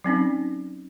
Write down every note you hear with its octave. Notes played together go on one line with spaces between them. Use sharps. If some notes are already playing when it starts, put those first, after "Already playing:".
F#3 C4 C#4 D#4